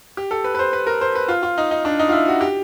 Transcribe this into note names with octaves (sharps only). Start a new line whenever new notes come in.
G4
A4
B4
B4
C5
B4
A#4
C5
B4
F4
F4
D#4
D#4
D4
D#4
F4
E4
F#4
G4